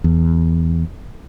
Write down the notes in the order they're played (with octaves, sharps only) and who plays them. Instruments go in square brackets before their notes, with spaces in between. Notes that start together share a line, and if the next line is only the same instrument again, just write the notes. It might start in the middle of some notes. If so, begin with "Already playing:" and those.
[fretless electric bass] E2